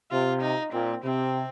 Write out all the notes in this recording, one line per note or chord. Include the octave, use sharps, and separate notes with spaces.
C3 F4
D#4
A#2 C4
C3 C4